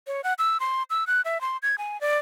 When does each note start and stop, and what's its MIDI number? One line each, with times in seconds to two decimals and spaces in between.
0.07 0.21 73
0.24 0.33 78
0.39 0.58 88
0.60 0.83 84
0.90 1.06 88
1.07 1.21 90
1.25 1.41 76
1.41 1.57 84
1.63 1.76 92
1.78 2.00 80
2.01 2.18 74